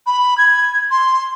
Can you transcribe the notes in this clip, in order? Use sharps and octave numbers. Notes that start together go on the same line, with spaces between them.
B5
G#6
C6